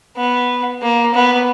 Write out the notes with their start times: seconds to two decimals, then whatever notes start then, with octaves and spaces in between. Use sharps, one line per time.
0.17 B3
0.82 A#3
1.15 B3